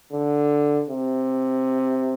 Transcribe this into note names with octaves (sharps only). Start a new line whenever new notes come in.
D3
C3